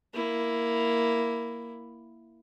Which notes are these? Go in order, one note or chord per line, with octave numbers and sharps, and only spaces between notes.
A#3 E4